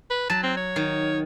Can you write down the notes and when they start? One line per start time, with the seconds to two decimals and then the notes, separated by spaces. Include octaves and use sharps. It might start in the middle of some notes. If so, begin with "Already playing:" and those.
0.10 B4
0.30 F#3 A5
0.43 C4
0.57 C#5
0.76 D#3